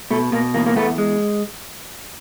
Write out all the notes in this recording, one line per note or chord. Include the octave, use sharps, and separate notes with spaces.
B2 A3
B2 A#3
E2 A#3
A#3
E2 A3 B3
G#3